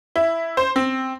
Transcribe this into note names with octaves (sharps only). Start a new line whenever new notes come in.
E4
C5
C4